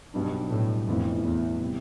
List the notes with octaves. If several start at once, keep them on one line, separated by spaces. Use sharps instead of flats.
B1 G2 B2 G3 D4
A2
A1 F2 A2 E3 B3 E4
E2
C3 G3 C4